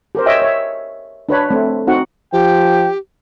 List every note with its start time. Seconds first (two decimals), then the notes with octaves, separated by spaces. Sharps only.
0.15 G4 A#4 C5
0.26 C#5 D#5 E5 G5
0.42 C#5 E5
1.29 D4 B4 C#5 B5
1.51 A3 C4
1.87 C4 D#4 F#4 F#5
2.33 F3 G4 G5